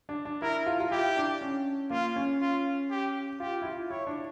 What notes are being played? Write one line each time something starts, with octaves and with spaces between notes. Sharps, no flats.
D4
D4
E4 A#4
F4
F4
E4 G4
D4
C#4
A#3 F4
C#4
F4
G4
F4 G4
E4
F4
E4 C#5
D4